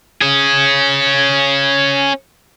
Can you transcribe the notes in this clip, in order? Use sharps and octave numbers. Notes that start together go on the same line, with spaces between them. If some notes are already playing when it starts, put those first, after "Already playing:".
C#4 G#4